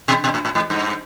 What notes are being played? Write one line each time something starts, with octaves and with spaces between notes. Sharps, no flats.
B2
B2
A2
A2
G#2
G2